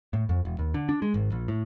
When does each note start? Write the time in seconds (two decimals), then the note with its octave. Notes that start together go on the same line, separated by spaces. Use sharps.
0.13 A2
0.29 F2
0.45 E1
0.59 D#2
0.74 D3
0.89 D4
1.02 G#3
1.14 G#1
1.32 A#1
1.48 A2